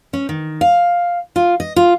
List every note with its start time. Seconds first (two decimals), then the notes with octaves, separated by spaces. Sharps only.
0.13 C#4
0.29 D#3
0.61 F5
1.36 F4
1.60 D#5
1.76 F4